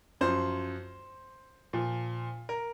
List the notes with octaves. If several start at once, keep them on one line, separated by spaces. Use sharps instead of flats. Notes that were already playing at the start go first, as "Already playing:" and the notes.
F#2 F3 C5
A#2 F3
A#4